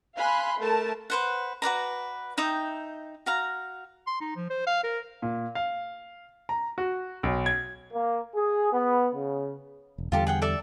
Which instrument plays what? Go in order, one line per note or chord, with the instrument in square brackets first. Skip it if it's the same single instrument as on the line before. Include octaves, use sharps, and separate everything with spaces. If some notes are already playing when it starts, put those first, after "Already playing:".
[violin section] F5 G#5 B5 C6 F#6
A3 A#4 A5
[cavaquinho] B4 C5 F#5
F#4 B4 D5 A#5
D#4 E5 G5 D#6
F#4 F5 A#5
[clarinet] C6
D#4
F3
C5
F5
A#4
[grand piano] A#2
F5
A#5
F#4
B1
G#6
[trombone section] A#3
G#4
B3
C#3
[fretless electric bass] E1
[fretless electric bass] E2 D3 G3 [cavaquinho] F4 G4 A4
[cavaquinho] G#4 F#5 G5
A4 D5 E5